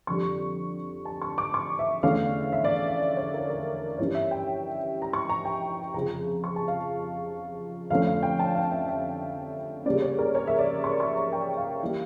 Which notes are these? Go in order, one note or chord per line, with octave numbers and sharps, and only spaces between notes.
F2 D3 G3 C#6
A5
C#6
D6
C#6
E5
E2 D3 A3 C#4 F5
E5
D5
F5
E5
C#5
A#4
A#4
G2 E3 G3 C#4 C#5
E5
G5
A#5
C#6
A#5
G5
F2 C#3 F3 A#5
C#6
A5
F5
F2 D3 A3 C#4 F5
F5
G5
A5
F5
E5
E5
C#3 G3 A#3 C#4 D5
C#5
A#4
C#5
E5
D5
C#6
C#6
A#5
G5
F5
E3 G3 A#3